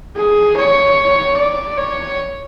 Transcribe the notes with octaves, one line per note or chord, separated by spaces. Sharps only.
G#4
C#5
D5
C#5